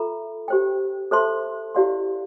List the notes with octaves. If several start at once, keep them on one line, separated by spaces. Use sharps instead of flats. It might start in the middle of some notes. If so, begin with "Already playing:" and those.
Already playing: F4 A4 E5 A#5
G4 C5 G5
A4 C5 E5 A5 C6
E4 G4 D5 F5 C6